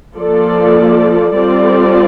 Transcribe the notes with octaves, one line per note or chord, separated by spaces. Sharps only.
F3 A#3 F4 A4 D5
G3 C4 F4 A4 D5